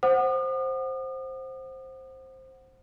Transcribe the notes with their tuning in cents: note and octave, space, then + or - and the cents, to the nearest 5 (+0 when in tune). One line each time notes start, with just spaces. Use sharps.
C5 +10 F#5 +0 D#6 -45